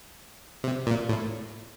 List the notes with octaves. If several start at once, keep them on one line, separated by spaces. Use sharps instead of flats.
C3
A#2
A2